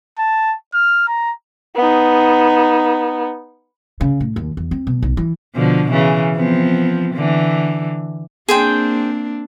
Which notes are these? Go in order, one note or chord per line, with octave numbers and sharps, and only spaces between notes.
A5
F6
A#5
B3 D#4
C#3
A2
D#2
E2
C4
B2
B1
E3
B2 D3 F3
C#3 E3
F3 B3 C4
D3 E3
A#3 C4 D4 G#4 C5 G5